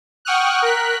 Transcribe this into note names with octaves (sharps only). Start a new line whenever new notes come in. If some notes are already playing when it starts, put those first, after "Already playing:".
F#5 G5 C#6 D#6 F6 F#6
A#4 F#6 B6